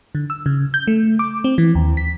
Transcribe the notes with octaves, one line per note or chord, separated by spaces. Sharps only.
D3
E6
C#3
G6
A3
D6
C4
E3
D#2
B6